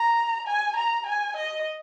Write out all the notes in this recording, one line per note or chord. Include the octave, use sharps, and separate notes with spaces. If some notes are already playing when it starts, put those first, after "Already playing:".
Already playing: A#5
G#5
A#5
G#5
D#5